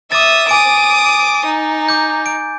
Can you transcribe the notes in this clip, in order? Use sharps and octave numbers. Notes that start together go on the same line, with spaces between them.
E5 D6 D#6 A6
G#5 D6 D#6 D7
D#4
D6 G6
D7